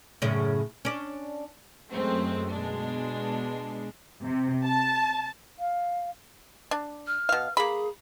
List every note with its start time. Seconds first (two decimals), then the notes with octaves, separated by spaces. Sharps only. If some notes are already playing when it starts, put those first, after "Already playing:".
0.22 F#2 A2 C#3
0.85 C#4 D4
1.92 F#2 G#3 A3 C4
2.52 B2 G#3 D4
4.23 C3
4.65 A5
5.59 F5
6.71 D4
7.07 F6
7.29 B2 F5
7.57 A#3 G#4 B5